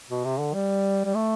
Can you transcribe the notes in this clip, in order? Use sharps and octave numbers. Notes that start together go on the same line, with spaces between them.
B2
C3
D3
G3
G3
A3